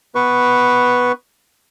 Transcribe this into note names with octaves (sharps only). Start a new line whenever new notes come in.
B3 B4 C#6